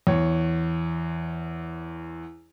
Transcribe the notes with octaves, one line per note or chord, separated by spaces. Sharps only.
E2 C#5